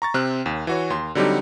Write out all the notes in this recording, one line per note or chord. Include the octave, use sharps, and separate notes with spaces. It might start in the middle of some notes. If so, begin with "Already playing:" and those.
A#5 C#6 A6
C3 C4 F6 F#6
D#2
E3 F#4 C#5
D#2 C6
D3 F#3 G3 C4 D#4 G4